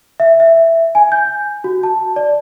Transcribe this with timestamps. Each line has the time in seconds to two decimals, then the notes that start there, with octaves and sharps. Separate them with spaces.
0.20 E5
0.40 E5
0.95 G#5
1.12 G6
1.64 F#4
1.83 A5
2.16 D5